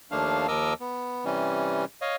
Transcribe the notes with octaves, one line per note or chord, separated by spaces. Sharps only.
D#2 F3 A3 A#3 D4 F5
D#2 F3 A#4 D#5 D6 E6
B3
C3 E3 G3 C#4
C#5 D#5 F5